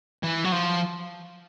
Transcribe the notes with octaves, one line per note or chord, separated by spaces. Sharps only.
E3
F#3
F3